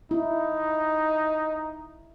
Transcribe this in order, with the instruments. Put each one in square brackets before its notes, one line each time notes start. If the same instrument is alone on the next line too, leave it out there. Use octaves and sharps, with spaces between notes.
[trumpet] D#4 [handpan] E4